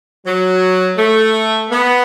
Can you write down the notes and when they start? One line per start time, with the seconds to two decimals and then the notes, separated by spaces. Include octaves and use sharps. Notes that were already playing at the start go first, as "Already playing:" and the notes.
0.25 F#3
0.97 A3
1.70 B3